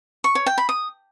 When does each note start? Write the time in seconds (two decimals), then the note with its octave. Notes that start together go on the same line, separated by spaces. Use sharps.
0.24 C#6
0.35 C#5
0.46 G5
0.58 B5
0.69 D#6